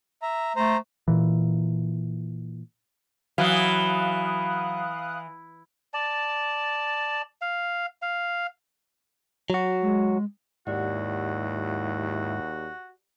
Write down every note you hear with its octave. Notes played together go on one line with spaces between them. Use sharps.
E5 A#5
A3 C5 A#5
A#2 E3
E3 F#3 F5 D#6 F#6
D5 A5
F5
F5
F#3 F#4
G#3
D#2 G#2 E4 F#4 G4 D5 F#5